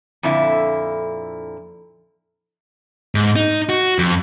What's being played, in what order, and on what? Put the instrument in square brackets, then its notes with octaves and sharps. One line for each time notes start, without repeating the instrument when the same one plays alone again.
[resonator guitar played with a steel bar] F2 A#2 D3 E4
[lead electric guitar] G#2
D#4
F#4
F2